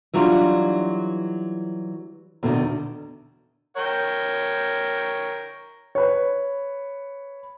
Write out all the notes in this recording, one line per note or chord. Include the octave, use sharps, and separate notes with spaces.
E3 F#3 G3 D4 D#4 F4
E2 B2 D3 D#3
A#4 C#5 G5
B4 C#5